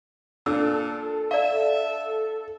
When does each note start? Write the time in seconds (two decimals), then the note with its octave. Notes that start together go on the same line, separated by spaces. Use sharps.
0.46 A#2 D4 A4 E6
1.31 D5 E5 F5